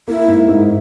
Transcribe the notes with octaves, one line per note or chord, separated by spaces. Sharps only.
A#3 E4
G#2
G#2